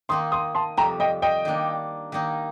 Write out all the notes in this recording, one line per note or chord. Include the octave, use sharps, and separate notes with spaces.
D#3 A#3 D#4 C6 D#6
C6 D#6
A5 C6
F2 C3 G3 G5 A#5
D#5 G5
D#5 G5
D#3 A#3 D4
D#3 A#3 D#4